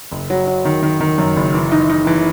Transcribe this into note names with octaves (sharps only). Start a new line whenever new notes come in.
F#1
F#3
F#3
D#3
D#3
D#3
F#2
F#1
E3
D#4
D#4
E3